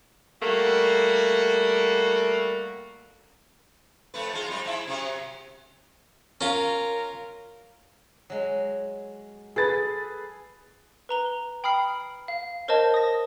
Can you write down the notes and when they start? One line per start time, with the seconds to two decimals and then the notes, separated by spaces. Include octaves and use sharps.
0.42 G3 A3 A#3 F#4
4.14 F2 A3 B4
4.33 G#3 D#4 F4
4.48 F2 G3 D#5
4.65 G#2 E4 E5
4.87 C3 F#3 C#4
6.41 C#4 F4 A#4
8.30 F#3 G#3
9.56 G#4 A4 B4 A6
11.09 B4 A#5 G7
11.64 G5 B5 D#6 F6 C7
12.28 F5
12.68 A#4 C5 C#5 D#5 A5
12.94 D#6 A#6